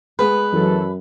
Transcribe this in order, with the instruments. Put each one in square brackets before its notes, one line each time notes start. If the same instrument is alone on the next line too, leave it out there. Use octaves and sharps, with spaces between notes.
[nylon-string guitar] G#3 B3 [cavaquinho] B4
[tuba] F#2 [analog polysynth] E3 F#3 A4